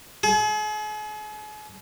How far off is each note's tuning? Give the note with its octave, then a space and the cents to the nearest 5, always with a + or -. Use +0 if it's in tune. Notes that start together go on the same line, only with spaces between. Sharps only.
G#4 +40